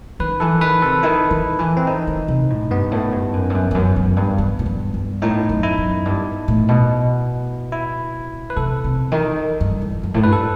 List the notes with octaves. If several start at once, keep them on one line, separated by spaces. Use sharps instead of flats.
D#3 B4
E3 A4
D#3 B4
C3 A4
D#3 E4
D#3
E3
C4
D#3 D#4
D#3
C3
A2
G2 B3
A2
G2
F#2
G2
F#2
E2
F#2
F#2
G2
G2
A2
G2
G2
A2 D#4
F#2
E4
F#2
G2
A2
B2
E4
B4
C3 A4
C3
D#3
G2
E2
F#2
A2
G2 B4
A4